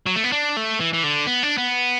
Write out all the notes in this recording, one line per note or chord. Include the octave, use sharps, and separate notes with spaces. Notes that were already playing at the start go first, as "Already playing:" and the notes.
F#3
A3
B3
D4
A3
E3
E3
D3
B3
D4
B3